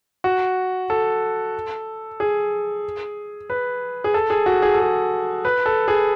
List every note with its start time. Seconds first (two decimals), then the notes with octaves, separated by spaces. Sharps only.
0.24 F#4
0.90 A4
2.20 G#4
3.50 B4
4.04 G#4
4.14 A4
4.30 G#4
4.46 F#4
4.62 G#4
4.74 A4
4.80 G#4
5.45 B4
5.66 A4
5.88 G#4